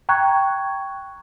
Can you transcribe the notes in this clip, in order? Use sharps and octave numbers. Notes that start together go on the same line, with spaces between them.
G5 A#5 C#6 F#6 G#6